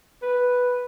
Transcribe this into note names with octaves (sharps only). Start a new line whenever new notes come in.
B4